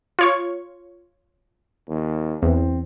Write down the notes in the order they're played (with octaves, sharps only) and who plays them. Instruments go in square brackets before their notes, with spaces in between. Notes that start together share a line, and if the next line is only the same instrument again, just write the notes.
[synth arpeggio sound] F4 C#5 C#6
[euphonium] D#2
[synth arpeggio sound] E2 [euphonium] C4